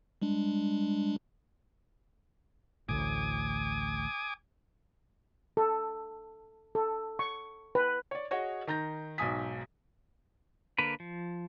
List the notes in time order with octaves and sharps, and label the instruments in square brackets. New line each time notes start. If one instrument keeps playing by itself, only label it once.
[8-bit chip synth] G3 G#3 D4
[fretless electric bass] A1 D2 A2 [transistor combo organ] G#5 D6 D#6
[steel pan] A4
A4
C#6
B4
[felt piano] C#5 D5
F#4 G#4 C#5 D#5
D#3 A#5 G6 A#6
B1 G#2 G#5 D#6 B6
[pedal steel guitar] D3 A#3 A#4 B4
F3